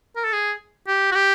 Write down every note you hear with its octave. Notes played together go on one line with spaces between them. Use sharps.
A#4
A4
G#4
G4
F#4
G4